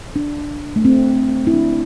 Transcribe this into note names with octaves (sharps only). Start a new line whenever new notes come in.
D4
A3
C4
E4
D4